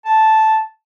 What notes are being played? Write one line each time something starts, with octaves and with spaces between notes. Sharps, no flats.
A5